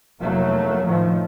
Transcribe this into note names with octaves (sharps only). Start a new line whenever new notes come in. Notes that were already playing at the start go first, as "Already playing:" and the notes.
F1 E2 F#3 A3 A#3
A2 D#3 F3